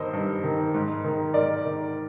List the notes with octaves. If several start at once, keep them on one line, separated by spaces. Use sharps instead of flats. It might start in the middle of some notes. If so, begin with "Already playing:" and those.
Already playing: G2 D#3 C5 D#5
G2
D#3
G#2
D#3
G#2 A#4 D5
D#3